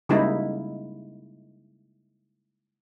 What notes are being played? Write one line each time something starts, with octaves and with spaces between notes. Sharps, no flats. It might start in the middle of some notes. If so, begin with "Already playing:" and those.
C#3 G3 G#3 A#3 D#4 E4